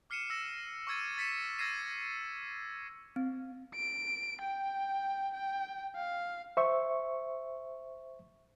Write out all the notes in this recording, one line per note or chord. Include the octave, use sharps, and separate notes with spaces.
D6 F6 C7 C#7 D#7 E7
E6 A#6 E7
C#6 D6 E6 G#6 A6 D#7
A6 B6 C#7 E7
E6 G#6 A#6 C7 D#7 E7
C4
D7
G5
G5
F5
C5 E5 C#6